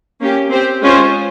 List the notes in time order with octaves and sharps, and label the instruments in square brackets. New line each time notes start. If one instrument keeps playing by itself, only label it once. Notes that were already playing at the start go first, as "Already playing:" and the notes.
[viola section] A#3 C#4 G4
C4 G4 C5
G#3 C#4 F4 C5